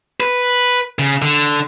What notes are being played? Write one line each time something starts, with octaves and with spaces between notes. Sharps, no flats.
B4
C#3
D3